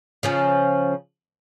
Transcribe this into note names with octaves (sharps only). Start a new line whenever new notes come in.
C#3 F3 C#4